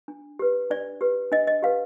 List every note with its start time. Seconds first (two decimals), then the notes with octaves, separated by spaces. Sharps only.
0.08 D4
0.39 G4 B4
0.70 D4 D5
1.01 G4 B4
1.32 D4 D#5
1.47 D#5
1.63 G4 B4 F5